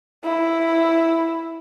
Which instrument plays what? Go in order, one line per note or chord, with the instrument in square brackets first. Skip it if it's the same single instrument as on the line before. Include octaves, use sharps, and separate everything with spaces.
[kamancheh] E4